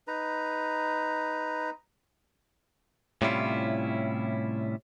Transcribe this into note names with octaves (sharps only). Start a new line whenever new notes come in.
D#4 B4 A#5
A2 C3 G3 C#4 E4 F4